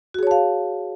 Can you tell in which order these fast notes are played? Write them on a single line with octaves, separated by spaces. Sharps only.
F#4 G#4 C#5 A5 F5